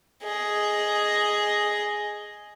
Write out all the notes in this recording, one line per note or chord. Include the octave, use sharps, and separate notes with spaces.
G#4 D#5